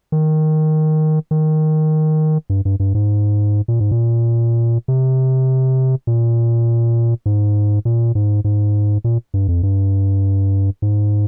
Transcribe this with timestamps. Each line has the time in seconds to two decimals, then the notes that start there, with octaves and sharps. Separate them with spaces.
0.12 D#3
1.31 D#3
2.50 G2
2.65 G2
2.80 G2
2.95 G#2
3.68 A#2
3.80 G#2
3.91 A#2
4.88 C3
6.07 A#2
7.26 G#2
7.85 A#2
8.15 G#2
8.44 G#2
9.04 A#2
9.34 G2
9.48 F2
9.63 G2
10.82 G#2